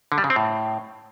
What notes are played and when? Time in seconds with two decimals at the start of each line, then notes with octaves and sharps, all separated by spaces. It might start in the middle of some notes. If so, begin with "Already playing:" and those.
0.12 D3
0.18 G3
0.24 C#3
0.30 C4
0.36 A2